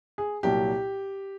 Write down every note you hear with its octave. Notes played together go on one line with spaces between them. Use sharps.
G#4
C2 A#2 F#3 G4